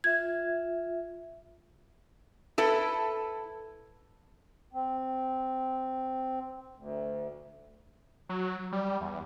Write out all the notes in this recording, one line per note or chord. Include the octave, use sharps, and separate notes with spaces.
F4 E5 G#6
E4 A4 B4
C4
D2
F#3
G3
E2